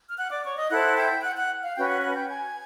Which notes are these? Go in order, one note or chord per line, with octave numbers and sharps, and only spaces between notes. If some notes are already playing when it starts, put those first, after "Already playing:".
F6
F#5 F#6
D5 D6
C#5 C#6
D#5 D#6
E4 A4 C5 F#5 F#6
G5 G6
F#5 F#6
G6
F#5 F#6
F5 F6
C#4 F#4 B4 G5 G6
F#5 F#6
F#5 F#6
G5 G6
G#5 G#6